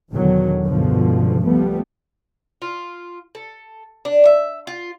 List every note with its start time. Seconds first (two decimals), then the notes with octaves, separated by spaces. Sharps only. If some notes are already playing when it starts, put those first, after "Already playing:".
0.12 E2 B2 D3 D#3 F#3
0.65 C#2 G2 B2 D3 F3
1.45 F3 G3 A3 B3
2.62 F4
3.35 A4
4.05 D4
4.25 E5
4.67 F4